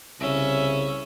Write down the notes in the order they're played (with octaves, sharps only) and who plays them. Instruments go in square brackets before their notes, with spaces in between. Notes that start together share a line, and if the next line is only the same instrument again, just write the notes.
[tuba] C2 [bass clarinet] C#3 [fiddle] C#4 [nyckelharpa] E5